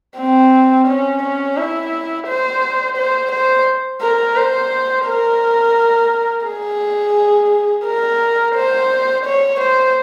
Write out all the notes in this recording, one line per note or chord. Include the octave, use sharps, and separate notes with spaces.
C4
C#4
C#4
E4
C5
C5
C5
A#4
C5
A#4
G#4
A#4
C5
C#5
C5